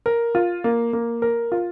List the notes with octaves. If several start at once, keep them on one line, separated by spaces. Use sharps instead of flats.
A#4
F4
A#3
A#3
A#4
F4